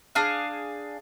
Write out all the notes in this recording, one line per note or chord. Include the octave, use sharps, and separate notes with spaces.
D4 G#4 F5